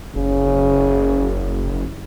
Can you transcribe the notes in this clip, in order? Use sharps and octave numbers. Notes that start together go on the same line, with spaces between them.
F#1 C#3